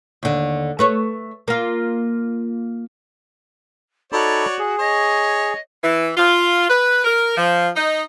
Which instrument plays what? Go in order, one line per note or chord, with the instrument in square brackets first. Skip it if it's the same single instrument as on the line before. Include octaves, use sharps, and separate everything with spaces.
[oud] D#2 D3
A3 B4 C#5
A#3 F4
[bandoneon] D#4 A4 B5 [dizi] F#4 [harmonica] C#5 D5
[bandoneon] G#4
[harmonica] C#5 [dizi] D#5
[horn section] E3
F4
B4
A#4
F3
D#4